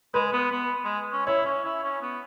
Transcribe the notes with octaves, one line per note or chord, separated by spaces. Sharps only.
G#3 B4
B3
B3
G#3
C#4
E4 C#5
C#4
E4
C#4
B3